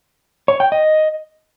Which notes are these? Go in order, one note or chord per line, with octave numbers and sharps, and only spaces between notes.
C#5
G5
D#5